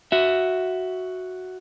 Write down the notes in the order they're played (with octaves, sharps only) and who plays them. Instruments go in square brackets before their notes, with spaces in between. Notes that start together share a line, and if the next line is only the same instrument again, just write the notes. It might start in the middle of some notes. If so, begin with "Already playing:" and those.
[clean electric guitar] F#4 E5